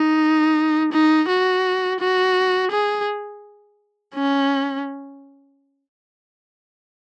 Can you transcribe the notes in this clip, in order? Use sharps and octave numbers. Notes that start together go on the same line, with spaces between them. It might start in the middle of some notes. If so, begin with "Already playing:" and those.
Already playing: D#4
D#4
F#4
F#4
G#4
C#4